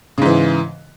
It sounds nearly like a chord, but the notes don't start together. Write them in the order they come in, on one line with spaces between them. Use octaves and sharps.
C#3 G#2 E3